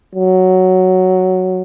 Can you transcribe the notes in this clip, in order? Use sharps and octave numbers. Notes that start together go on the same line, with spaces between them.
F#3